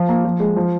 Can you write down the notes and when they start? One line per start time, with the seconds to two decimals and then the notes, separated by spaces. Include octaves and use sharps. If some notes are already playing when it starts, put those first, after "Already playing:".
Already playing: F3 F4
0.08 A#3
0.25 F3
0.40 G#3
0.56 F3